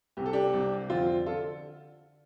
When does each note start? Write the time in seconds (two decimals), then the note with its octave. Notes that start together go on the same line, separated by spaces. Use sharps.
0.17 C2 C3 G4
0.26 A4
0.33 D4 G4
0.54 C2 C3
0.90 F2 D3 C4 F4
1.26 D3 F4 A4